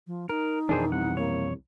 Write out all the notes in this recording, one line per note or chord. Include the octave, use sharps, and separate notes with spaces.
F3
D#4 A#4
F2 B2 D#3 E3 D4 G#4 C5
C2 F#5
C2 A#3 C#5